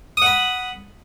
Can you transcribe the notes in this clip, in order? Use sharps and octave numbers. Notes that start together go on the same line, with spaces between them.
F#5 B5 D#6